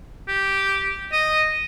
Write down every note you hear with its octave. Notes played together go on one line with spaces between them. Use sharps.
G4
D#5